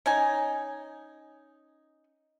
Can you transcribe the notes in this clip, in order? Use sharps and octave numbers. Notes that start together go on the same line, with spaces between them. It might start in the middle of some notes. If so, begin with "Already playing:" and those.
C#4 D#4 G#5